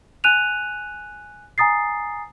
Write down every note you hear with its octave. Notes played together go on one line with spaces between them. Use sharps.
G#5 F#6 D#7 F7
G#5 A#5 D#6 A6 C7